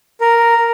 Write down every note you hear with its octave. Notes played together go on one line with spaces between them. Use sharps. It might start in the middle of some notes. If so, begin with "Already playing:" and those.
A#4